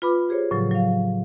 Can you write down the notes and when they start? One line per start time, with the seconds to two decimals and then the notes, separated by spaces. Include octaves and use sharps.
0.02 F4 B4 B5 D6
0.29 G4 G#4 C5 C#5
0.51 A2 C#3 F3 F#3
0.71 F#3 F5